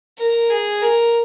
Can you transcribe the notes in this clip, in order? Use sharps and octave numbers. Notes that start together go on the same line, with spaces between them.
A#4
G#4
A#4